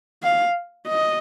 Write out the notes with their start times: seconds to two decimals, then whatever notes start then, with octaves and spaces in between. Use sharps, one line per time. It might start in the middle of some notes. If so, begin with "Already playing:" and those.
0.23 F5
0.88 D#5